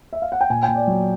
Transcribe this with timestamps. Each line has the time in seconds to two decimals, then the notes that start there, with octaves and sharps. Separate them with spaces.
0.13 E5
0.22 F5
0.32 F#5
0.41 G5
0.50 A#2 G#5
0.63 G5
0.68 A#2
0.75 D5
0.87 F#3